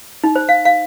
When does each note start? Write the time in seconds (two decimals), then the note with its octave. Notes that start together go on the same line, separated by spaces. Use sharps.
0.24 D#4
0.36 C5
0.49 F5
0.65 F5